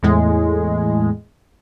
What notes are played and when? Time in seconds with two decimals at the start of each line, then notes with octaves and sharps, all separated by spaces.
0.03 E2 A2 G#3